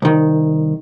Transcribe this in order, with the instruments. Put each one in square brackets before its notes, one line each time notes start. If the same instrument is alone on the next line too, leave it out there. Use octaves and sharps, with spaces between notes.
[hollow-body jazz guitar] C2 D#3